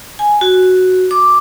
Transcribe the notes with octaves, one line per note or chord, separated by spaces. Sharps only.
G#5
F#4
D6